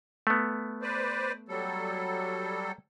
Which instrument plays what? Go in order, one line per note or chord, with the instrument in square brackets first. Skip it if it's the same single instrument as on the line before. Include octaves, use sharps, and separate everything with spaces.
[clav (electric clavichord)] A3 B3
[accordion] B4 C5 D5
F#3 G3 A4